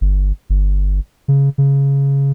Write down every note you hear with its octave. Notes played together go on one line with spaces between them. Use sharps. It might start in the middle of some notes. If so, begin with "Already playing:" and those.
G1
G1
C#3
C#3